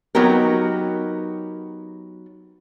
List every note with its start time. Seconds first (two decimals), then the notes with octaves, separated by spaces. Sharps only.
0.15 F#3 B3 D#4 G4 A#4